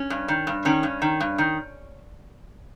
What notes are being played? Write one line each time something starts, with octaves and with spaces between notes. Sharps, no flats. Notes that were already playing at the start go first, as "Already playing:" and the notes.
Already playing: C#4
G2
D#3
G2
D#3 C#4
G2
D#3
G2
D#3